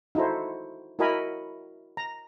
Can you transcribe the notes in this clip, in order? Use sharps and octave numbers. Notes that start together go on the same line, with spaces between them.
D#4 E4 F#4 A4 C5
E4 F#4 A#4 D#5 G#5 B5
A#5